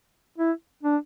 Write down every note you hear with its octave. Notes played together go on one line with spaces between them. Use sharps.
E4
D4